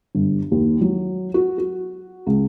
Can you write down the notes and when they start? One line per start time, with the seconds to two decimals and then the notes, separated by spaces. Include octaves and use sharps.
0.15 G1
0.51 D#2
0.81 F#3
1.34 F#4
1.58 F#4
2.26 C#2